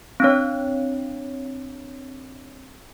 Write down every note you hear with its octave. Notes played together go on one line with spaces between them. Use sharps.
C4 D4 C#5